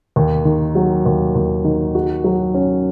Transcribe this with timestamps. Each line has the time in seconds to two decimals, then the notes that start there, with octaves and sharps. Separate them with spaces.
0.16 D#2
0.45 D#3
0.75 F#3
1.06 D#2
1.35 D#2
1.64 D#3
1.95 F#4
2.24 F#3
2.54 C#4